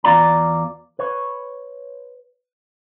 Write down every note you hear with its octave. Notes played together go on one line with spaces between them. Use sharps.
E2 F4 D5 A#5
B4 C#5